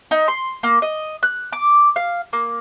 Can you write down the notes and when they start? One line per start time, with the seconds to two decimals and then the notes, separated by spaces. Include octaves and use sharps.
0.11 D#4
0.28 C6
0.63 A#3
0.82 D#5
1.23 F#6
1.53 D6
1.96 F5
2.33 A#3